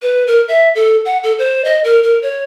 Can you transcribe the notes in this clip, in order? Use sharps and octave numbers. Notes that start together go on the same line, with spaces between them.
B4
A#4
E5
A4
F#5
A4
C5
D#5
A#4
A#4
C#5